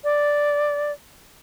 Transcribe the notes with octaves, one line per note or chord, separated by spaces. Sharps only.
D5